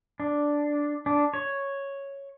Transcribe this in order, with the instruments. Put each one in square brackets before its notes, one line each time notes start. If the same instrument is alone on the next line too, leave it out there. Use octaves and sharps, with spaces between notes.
[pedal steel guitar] D4
D4
C#5